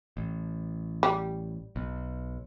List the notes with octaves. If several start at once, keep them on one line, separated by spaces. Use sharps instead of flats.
A1
G3
B1